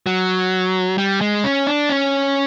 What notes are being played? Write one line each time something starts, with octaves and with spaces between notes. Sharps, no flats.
F#3
G3
G#3
C#4
D4
C#4